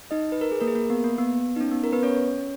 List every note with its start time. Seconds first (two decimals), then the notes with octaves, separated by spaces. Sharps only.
0.11 D#4 D#5
0.32 B4
0.41 A#4
0.52 G#4
0.61 A#3 A#4
0.67 G#4
0.75 A#3 A#4
0.90 B3
1.04 A#3
1.18 B3
1.56 D#4
1.61 C#4
1.71 B3
1.84 A#4
1.92 B3 B4
2.03 C#4 C#5